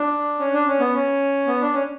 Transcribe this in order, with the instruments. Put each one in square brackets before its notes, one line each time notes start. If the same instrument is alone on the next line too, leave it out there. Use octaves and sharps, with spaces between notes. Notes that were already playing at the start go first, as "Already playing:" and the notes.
Already playing: [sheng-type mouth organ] D4
C#4
D4
C#4
B3
C#4
B3
D4
C#4